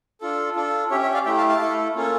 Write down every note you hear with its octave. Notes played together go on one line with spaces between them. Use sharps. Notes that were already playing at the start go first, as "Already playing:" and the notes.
D4 F4 A4
D4 F4 A4
C#4 G4 C#5 E5
C#5 E5
D5 F5
A3 E4 G4 E5 G5
F5 A5
F5 A5
A3 E4 A4
A#3 C#4 F4 A4